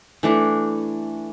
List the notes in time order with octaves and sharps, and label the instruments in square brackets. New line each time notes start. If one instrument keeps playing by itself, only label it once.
[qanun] E3 A3 D4